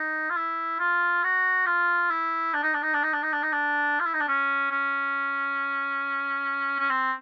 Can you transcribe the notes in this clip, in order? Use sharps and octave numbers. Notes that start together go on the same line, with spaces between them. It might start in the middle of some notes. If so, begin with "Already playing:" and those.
Already playing: D#4
F4
E4
F4
F#4
F4
E4
D4
D#4
D4
D#4
D4
D#4
D4
D#4
D4
D#4
D4
F4
E4
D#4
D4
C#4
C#4
C#4
C4